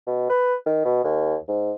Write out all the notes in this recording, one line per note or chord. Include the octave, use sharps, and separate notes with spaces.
B2
B4
D#3
B2
D#2
G#2